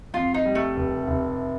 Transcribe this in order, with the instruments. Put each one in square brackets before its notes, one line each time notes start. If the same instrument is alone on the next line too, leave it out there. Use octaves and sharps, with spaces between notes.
[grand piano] F2 [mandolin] F4
[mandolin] D#4
[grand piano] G3
[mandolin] A3
[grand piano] F1
F1